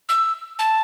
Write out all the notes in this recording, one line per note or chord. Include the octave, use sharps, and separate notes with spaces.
E6
A5